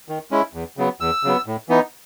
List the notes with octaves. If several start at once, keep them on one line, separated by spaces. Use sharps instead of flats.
D#3
G#3 C#4 E4
E2
C#3 F#3 B3
E2 E6
C#3 F#3 B3
A2
E3 B3 D#4